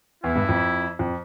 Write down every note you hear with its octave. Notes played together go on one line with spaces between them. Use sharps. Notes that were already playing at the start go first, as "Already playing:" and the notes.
E2 E4
G2
F2
F2